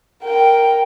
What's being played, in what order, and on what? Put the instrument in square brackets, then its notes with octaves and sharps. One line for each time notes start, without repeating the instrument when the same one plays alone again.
[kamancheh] A#4 G5